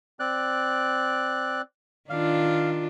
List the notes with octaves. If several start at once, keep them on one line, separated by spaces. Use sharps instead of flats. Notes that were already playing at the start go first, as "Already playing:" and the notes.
C4 D5 F#6
D#3 D4 F4 F5